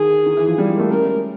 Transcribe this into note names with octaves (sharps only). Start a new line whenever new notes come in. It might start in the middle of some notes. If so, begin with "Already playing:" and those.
Already playing: D#3 G#4
D#3
E3
F3
G3
G#3
A#3
A3
C#4 A#4